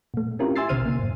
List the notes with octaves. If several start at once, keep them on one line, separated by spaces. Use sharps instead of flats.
A#2 A3
C4 C#4 E4 F4 G4 A#4
E5 G#5 C6 E6 A6 C7
A#1 B2 D3 C5 F6 D#7
C3 A#3
F#2 A2